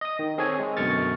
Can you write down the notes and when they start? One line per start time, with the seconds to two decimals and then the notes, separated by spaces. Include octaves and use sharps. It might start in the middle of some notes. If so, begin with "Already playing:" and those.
0.01 D#5 D#6
0.19 D#3
0.38 C4 G#4 A4 C#5 G#5
0.60 G#3
0.77 F#2 B2 D3 C#6 F6 A6